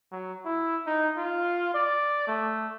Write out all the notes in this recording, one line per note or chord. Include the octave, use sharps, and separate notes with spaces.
F#3
E4
D#4
F4
D5
A3